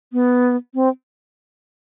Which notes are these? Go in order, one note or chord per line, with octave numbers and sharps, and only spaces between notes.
B3
C4